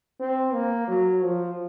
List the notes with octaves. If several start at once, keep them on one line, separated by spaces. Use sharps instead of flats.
C4
A#3
F#3
F3